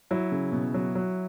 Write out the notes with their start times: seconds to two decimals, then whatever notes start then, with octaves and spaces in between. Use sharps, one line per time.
0.11 F#3 E4
0.32 C#3
0.52 B2
0.74 F#3
0.95 F#3